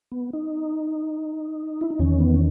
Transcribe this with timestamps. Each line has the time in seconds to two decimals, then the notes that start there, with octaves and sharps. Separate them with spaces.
0.12 B3
0.33 D#4
1.81 E4
1.90 D#4
1.99 E2 D#3 C#4
2.20 B3
2.34 C#4